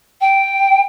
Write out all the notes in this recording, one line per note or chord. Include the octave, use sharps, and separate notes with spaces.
G5